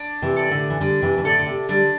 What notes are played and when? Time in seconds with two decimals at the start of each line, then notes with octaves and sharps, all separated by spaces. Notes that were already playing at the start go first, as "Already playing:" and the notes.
Already playing: D4
0.22 C3 E3
0.36 A4 D5
0.51 A2 D3
0.70 E3
0.81 D3 G3 D4
1.02 C3 E3
1.18 E3
1.24 A2 D3 A4 D5
1.39 D3
1.46 C3
1.69 D3 G3 D4